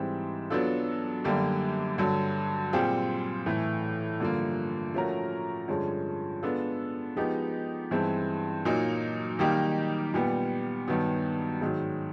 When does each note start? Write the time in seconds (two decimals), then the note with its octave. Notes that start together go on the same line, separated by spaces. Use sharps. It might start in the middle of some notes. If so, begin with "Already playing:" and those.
Already playing: G#2 E3 G3 C4
0.50 F#3 B3 D4 F4 A4
1.24 F#2 D3 G3 A#3
1.98 G2 D3 F#3
2.73 A#2 G3 C4 F4 G#4
3.46 A2 E3 A3
4.20 G2 D3 F3 A#3
4.94 F3 A3 C#4 F#4 A#4
5.68 G2 D3 F3 G#3 C#4
6.43 G#3 B3 D4 F4 A4
7.16 F3 G#3 B3 D#4 G4
7.91 G2 E3 G#3 C4
8.65 A#2 F#3 A#3 D#4
9.39 D#3 G3 A#3 D#4 G4
10.14 A#2 G3 B3
10.88 G2 D#3 F#3 B3
11.61 G#2 D#3 F#3